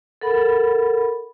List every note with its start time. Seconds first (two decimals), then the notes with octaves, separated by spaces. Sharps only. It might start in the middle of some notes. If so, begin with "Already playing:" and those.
0.21 A4 A#4 F#5 B5